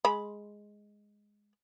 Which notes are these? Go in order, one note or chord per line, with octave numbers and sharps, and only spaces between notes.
G#3 B5